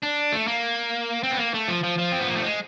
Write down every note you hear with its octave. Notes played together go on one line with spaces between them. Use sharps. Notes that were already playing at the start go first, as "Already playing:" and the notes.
D4
A3
A#3
C4
B3
A#3
A3
F3
F3
F3
C4
B3
A#3
A3
G#3